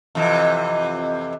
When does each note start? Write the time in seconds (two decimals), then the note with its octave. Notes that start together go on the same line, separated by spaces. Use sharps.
0.15 F2 C3 E3